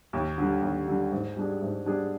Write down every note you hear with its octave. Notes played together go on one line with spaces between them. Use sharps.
D#2
D3 G3
D#2
D3 G3
G#2
G3 D4 G#4
G#2
G3 D4 G#4